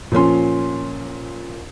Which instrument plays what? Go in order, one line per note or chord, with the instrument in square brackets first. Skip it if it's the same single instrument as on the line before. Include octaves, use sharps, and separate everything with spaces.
[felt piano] A#2 F3 C#4 C6